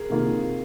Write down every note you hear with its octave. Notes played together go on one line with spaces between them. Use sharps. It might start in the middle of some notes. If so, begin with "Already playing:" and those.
Already playing: G#4 A#4
C3 D#3 A#3 F4